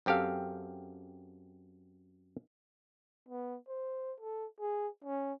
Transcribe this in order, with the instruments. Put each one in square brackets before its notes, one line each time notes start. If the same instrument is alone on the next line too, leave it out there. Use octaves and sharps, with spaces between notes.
[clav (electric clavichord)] F#2 C4 G4 A4 F5
[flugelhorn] B3
C5
A4
G#4
C#4